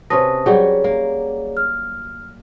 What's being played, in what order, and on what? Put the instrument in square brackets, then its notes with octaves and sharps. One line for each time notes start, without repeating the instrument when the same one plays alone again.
[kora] C3 C#4 B4 [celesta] A5 D#6 A#6
[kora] F#3 G3 F#4 [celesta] G#4 C#5 D5
[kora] A#3
[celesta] F6